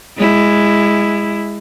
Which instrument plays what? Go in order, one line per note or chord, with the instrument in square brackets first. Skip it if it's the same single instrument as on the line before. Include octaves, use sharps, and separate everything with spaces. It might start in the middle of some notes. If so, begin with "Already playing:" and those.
[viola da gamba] G#3 E4